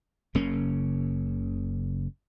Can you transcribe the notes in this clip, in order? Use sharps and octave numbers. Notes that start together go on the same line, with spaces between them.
F#1 C#3 A#3 C#4